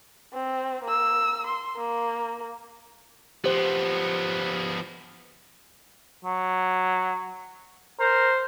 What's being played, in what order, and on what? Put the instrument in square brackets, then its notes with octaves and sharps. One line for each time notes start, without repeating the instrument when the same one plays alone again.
[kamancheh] C4
A#3 E6
C6
A#3
[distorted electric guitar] F3 B3 [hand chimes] G4 C5
[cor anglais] F#3
[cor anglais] A#4 [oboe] C5